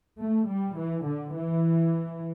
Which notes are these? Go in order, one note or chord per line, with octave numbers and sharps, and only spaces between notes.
A3
G3
E3
D3
E3